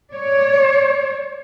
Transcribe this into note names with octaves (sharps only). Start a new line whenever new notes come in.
C#5 D5